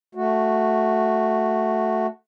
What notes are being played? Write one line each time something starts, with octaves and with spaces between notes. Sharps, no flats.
A3 F#4